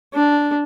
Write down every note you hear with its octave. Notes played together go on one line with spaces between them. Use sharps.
D4